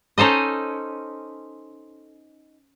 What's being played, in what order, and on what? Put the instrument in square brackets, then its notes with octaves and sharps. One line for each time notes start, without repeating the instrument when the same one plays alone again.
[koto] C#4 D#4 A4 C5 D#5